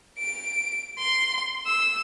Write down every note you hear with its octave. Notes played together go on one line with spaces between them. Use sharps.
D7
C6
E6